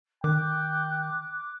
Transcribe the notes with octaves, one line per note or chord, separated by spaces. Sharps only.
D#3 G5 D6 F#6